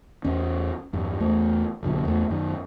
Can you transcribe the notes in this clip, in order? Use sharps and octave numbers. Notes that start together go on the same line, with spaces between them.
E2 C#4
E2 G2
E2 A3
B1 F#2 D3 F#3
E2 A3
F#2 D#3